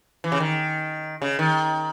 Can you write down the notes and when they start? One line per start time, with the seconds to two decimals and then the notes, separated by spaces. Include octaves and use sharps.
0.24 E3
0.32 C#3
0.40 D#3
1.22 C#3
1.39 D#3